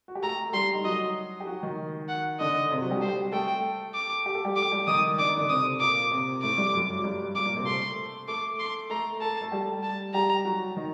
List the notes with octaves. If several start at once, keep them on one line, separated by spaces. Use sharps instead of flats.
F#4
G4
A3 A4 A#5
A4
G3 G4 C6
D#4
F#3 F#4 D#5
G4
F#3 F#4
D#3 D#4
F#5
D3 D4 D#5
C3 C4
F#3 F#4
G3 G4
G3 G4 C5
A3 A4 G5
D6
G4
A4
G3 G4
D6
G3 G4
D#3 D#4 D#6
D4 D6
D#4
D3 D4
C3 C4 D#6
A#2 A#3 D6
C3 C4
A2 A3 D6
G2 G3
F#2 F#3
F#3
G2 G3
G2 G3 D6
A#2 A#3
C3 C4
A3 A4 C6
A3 A4 D6
C6
A3 A4 A#5
A4 A5
A3 A4
G3 G4
A5
G3 G4 A#5
F#3 F#4
D#3 D#4